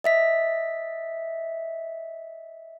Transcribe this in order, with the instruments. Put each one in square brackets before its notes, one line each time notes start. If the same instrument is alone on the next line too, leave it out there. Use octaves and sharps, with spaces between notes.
[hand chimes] D#5 E5 B6